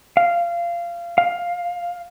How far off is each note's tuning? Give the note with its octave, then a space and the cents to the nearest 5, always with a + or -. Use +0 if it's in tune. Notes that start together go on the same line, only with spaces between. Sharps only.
F5 -20
F5 +10